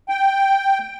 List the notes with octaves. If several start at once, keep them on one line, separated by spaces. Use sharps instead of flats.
G5